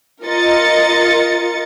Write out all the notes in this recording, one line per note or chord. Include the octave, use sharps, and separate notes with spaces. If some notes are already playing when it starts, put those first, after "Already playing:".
F4 A#4 D#5 A6 C#7